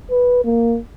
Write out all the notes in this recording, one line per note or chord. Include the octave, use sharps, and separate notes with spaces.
B4
A#3